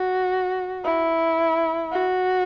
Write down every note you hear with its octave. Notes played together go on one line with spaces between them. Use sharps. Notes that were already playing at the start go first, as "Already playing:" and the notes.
Already playing: F#4
E4
F#4